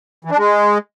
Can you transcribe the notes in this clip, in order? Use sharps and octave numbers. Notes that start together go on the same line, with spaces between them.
E3
D4
G#3